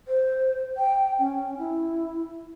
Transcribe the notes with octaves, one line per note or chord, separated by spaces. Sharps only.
C5
G5
C#4
E4